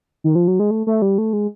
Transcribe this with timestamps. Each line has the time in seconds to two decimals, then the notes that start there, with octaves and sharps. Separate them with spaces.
0.24 D#3
0.35 F3
0.48 F#3
0.59 G#3
0.71 A3
0.87 A3
1.02 G3
1.18 A3
1.33 G#3